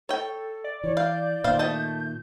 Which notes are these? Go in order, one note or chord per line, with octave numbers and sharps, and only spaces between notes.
A4 C#5 G5
D5
E3 C#5
F5 G6
A#2 D#3 C5 F5
A3 D#5 A5